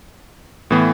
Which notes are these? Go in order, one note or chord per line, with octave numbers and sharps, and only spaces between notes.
A2 E3 B3